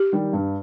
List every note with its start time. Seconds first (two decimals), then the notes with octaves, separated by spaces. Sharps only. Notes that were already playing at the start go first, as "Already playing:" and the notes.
Already playing: G4
0.12 D#3 G3
0.33 G2